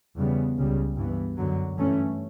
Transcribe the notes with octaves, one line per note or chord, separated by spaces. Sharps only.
E2 C#3 G3 B3
C#2 C#3 G3
G2 E3 B3
F#2 D3 F#3
G2 E3 A3 C#4